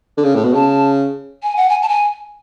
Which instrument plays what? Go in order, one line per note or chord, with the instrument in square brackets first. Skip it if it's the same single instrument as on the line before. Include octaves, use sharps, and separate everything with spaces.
[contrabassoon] D3
C#3
A2
B2
[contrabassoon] C#3 [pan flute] A5
[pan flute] G#5
F#5
G#5
A5
G#5